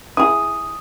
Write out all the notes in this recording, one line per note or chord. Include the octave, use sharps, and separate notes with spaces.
E4 G#4 D#6